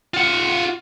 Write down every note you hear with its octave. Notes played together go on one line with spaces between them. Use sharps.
F4 F#5